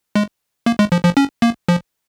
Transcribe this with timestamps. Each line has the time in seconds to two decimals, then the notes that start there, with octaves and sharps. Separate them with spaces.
0.15 G#3
0.66 A#3
0.79 G#3
0.92 F3
1.04 F3
1.17 C#4
1.42 A#3
1.68 F3